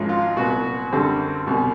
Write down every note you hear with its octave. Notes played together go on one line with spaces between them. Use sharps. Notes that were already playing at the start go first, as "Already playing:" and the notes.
Already playing: G#1 G#2 F3 G#3 C#4
F4
C2 A#2 F#3 B3 F#4
F#2 D3 G3 C4
C2 B2 G3